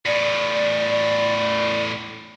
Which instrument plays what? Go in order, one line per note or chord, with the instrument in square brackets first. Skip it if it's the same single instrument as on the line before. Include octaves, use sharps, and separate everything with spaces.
[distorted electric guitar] E2 A2 [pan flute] D5